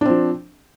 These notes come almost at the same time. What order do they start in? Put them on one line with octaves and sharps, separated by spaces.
D4 C4 F3